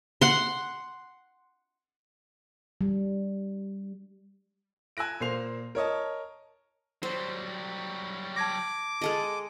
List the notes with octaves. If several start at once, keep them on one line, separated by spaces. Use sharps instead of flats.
F#5 C6
G3
G#5 E6 F#6 A#6 D7
A#2 A#3 C5 C7 F7
A#4 C#5 D#5 A5
F#3 G3 C5
A5 D6 G#6 A#6
G#3 A4 D#5